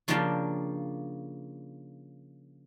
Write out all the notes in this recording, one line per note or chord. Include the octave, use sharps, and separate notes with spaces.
C#3 F3 A#3 D4 G4 A5